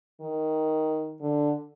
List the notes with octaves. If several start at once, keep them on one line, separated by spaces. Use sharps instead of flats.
D#3
D3